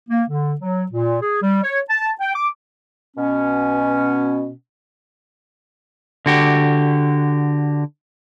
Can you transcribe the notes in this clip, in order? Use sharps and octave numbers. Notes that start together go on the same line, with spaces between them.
A#3
D3
F#3
A#2
G#4
G3
C#5
A5
G5
D6
B2 C#4
D3 F#4 G4